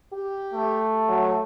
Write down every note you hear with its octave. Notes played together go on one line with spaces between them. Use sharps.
G4
A3
F#3